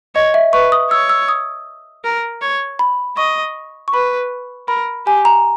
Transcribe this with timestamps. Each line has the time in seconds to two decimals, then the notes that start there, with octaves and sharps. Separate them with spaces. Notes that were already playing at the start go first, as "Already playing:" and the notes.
0.15 C#5 D#5
0.34 E5
0.53 B4 C#6
0.72 D#6
0.91 C#5 E6
1.09 E6
1.28 D#6
2.04 A#4
2.42 C#5
2.79 B5
3.17 D#5 C#6
3.88 C#6
3.93 B4 B5
4.68 A#4 B5
5.06 G4 G#5
5.25 A#5